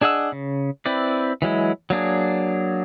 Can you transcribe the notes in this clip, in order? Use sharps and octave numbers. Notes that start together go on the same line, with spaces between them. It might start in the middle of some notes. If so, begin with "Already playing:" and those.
D4 G#4 D#5 F#5 E6
C#3
C4 E4 B4 D5
E3 F#3 G#3 E4
F#3 A#3 D4 G#4